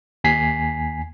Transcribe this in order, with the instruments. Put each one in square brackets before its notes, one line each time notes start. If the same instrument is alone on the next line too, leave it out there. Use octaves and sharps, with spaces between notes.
[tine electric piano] D#2 G#5 B6 C7